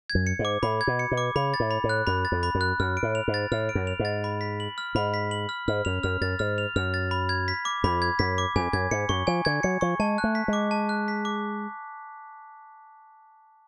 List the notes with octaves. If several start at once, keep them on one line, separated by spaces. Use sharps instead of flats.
G#6
F#2
C#7
G#2
D6
A2 B5
G#6
B2
C#7
B2
D6
C#3 B5
A6
A2
B5
A2
F#6
F#2 B5
A6
F2
B5
F#2
F#6
F#2 F6
D7
A2
F7
G#2
A6
A2 F6
D7
F#2
F7
G#2
A6
B5
B6
F#7
F6
G#2 B5
B6
F#7
F6
G#2 F6
F#2 F7
F#2 F6
F#2 A6
G#2 F6
F7
F#2 F6
A6
B5
G#6
B6
D6
F2 B5
G#6
F#2 B6
D6
F2 G#5
F#2 G#6
G#2 C#7
F#2 C#6
F3 G#5
D3 G#6
F#3 C#7
F3 C#6
G#3 A5
F#6
A3
B6
G#3 D6
A5
F#6
B6
D6